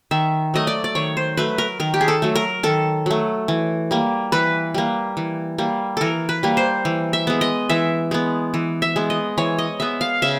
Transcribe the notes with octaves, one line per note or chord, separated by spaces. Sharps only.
D#3 E5
F#3 A3 D#5
D5
D5
D#3 C#5
C5
F#3 A3 B4
A#4
D#3 A#4
G4
G#4
A4
F#3 A3
A#4
D#3 A4
F#3 A3
E3
G3 A#3
E3 B4
G3 A#3
E3
G3 A#3
E3 A4 A#4
B4
G3 A#3
C5
E3
E5
G#3 B3
D#5
E3 E5
G#3 B3
E3
E5
G#3 B3
D#5
E3 C#5
D#5
G#3 B3 E5
F5
C#3 E5